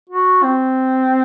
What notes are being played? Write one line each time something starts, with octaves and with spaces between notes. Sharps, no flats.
F#4
C4